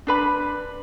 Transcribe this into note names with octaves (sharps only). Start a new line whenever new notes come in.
D4 B4 B5